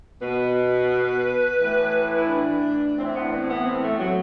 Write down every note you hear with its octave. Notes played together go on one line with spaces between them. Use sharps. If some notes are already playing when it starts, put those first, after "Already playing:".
B2 B4
A2 E3
E4
D4
A2 C4
E3
C4
B3
D4
C4
B3
C4
A3
F#3